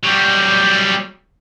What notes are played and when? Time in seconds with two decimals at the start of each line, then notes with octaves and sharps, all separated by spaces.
0.03 F#3 G3